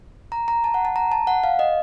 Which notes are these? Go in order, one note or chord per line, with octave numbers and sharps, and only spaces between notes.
A#5
A#5
A5
F#5
A5
A#5
A5
F#5
F5
D#5